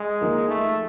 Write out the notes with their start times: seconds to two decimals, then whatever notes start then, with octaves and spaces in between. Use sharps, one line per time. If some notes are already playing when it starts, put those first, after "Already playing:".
Already playing: G#3
0.21 F3 A#3 D#4
0.49 A3